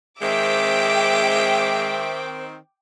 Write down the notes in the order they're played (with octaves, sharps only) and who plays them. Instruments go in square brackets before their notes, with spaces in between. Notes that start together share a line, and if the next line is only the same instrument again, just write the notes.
[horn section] D#3 C4 [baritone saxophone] G#3 [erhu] E5 [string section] G5 D6